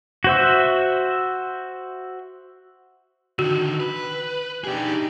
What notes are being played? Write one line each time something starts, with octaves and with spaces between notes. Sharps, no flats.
F#4 C5 E5
D3 D#3 F#4
B4
D4 D#4 G4 G#4